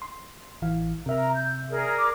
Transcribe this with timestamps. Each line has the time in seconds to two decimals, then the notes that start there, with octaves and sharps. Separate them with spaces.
0.02 C6
0.62 A1 E3 F5
1.06 C3 A#4 E5 A#5
1.33 G6
1.70 G#4 A#4 D5
1.99 D6